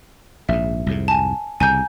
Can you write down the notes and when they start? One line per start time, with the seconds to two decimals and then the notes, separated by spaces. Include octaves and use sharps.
0.49 A#1 G#2 E5
0.86 C2 F2 G#2
1.08 G#5 A5
1.60 C2 C#3 G#5 A#5 G6